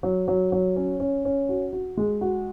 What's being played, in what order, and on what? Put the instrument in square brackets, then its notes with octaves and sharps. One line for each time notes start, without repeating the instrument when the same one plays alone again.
[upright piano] F#3
F#3
F#3
C#4
C#4
C#4
F#4
F#4
G#3
F#4